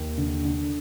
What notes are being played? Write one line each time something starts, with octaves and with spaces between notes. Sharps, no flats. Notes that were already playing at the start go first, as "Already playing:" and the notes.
Already playing: D#2
D3
D3